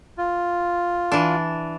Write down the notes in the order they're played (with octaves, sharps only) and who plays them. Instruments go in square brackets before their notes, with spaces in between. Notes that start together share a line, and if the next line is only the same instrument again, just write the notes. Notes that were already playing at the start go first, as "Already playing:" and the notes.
[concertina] F4
[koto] E3 D4